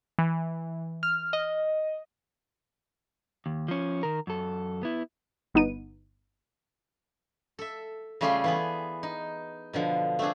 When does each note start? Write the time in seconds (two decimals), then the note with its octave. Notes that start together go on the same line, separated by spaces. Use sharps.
0.19 E3
1.03 F6
1.33 D#5
3.46 D#2
3.68 F3 C#4
4.03 D#3 A#4
4.27 F#2 A4
4.83 B3 E4
5.54 G1 B3 D#4 D#7
7.59 A4 E5
8.21 C#3 G3 A3 F4 G#4 C6
8.44 E3 B3 G#4
9.03 D#4
9.73 B2 D3 F3
10.19 A3 C4 D4 G#4